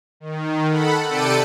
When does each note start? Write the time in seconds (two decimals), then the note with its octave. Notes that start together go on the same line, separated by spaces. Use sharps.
0.20 D#3
0.70 A4 F#5 B5
1.08 C3 A4 D5 G5 C#7 D#7